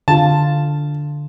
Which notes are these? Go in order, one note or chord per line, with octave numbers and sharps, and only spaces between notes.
D3 F4 A5